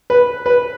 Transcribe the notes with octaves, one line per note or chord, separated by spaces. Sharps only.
B4
B4